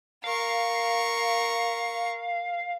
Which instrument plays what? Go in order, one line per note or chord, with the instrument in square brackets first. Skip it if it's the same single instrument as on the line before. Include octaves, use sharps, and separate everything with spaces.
[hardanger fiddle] A#4 C#6 [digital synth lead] F5